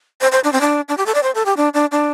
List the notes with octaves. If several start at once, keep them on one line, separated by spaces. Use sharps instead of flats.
C5
C5
D4
C4
D4
D4
G4
A4
D5
C5
A4
G4
D4
D4
D4